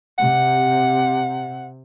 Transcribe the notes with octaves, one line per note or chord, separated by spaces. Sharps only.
C3 F#5